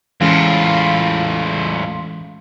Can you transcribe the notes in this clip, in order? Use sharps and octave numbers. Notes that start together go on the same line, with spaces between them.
E2 A2 E3 G#3 C#4 F4